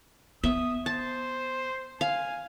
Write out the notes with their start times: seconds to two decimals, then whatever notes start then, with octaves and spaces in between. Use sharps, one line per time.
0.43 B3 E5 D#6
0.86 C5 A5
2.01 F5 G#5